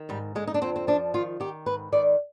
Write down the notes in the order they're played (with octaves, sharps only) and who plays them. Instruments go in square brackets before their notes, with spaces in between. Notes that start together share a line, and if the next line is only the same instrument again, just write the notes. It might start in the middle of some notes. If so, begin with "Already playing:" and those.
Already playing: [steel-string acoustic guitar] D#3
G#2 G3
D3 G#3
D#4
D4
F2 C4
C4
F3 D4
D#3 F4
D#3 G4
G#2 B4
D#3 D5